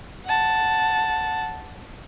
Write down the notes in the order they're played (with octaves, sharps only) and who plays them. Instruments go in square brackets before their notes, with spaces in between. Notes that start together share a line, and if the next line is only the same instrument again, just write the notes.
[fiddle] F#5 A5